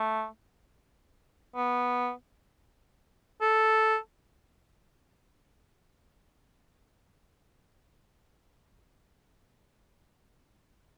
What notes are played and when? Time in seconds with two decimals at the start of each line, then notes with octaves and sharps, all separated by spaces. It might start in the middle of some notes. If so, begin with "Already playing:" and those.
Already playing: A3
1.56 B3
3.42 A4